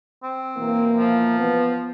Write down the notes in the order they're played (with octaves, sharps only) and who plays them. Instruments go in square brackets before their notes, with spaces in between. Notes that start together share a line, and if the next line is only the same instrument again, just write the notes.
[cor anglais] C4
[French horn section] B2 E3 A#3
[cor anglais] F3
[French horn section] B3